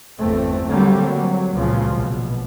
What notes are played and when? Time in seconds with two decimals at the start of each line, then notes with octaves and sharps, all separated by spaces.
0.19 G1 E2 A3 C4
0.68 D3 F#3 G3 A3 A#3 C4
1.01 F#3
1.55 C#2 A#2 C#3 F3 F#3
1.91 A#1 B2